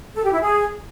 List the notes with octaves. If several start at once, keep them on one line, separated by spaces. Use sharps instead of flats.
A4
G4
E4
G#4